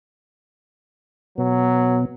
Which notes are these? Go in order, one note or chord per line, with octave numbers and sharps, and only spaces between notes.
B2 F#3 B3